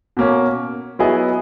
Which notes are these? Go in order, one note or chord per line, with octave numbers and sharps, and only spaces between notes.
B2 A#3 C#4
F#3 B3 E4 G#4 D#5